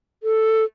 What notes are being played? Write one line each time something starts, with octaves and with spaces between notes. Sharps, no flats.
A4